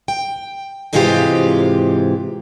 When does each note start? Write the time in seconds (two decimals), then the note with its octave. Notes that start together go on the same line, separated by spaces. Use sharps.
0.08 G5
0.93 G#2 C3 E3 G#3 F4 G4